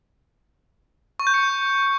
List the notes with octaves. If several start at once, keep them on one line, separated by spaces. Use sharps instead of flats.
C#6
G6
C#7